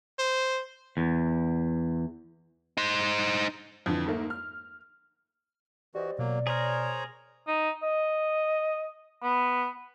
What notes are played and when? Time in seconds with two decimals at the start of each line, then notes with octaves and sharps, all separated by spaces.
0.19 C5
0.97 E2
2.77 D#4 C5
3.86 F2 D3 E3
4.06 G#2 A3 A#3
4.30 F6
5.95 E3 F#4 G4 C5 D5 D#5
6.18 B2 F#3 A#3
6.47 G#4 A#4 C5 C#5 A#5
7.47 D#4
7.83 D#5
9.22 B3